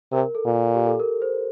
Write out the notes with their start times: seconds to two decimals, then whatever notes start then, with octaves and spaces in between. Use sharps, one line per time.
0.12 C3 A#4
0.35 A4
0.45 A#2
0.75 G4
0.87 A4
1.00 A#4
1.22 C5